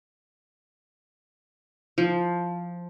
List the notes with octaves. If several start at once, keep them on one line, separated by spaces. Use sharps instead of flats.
F3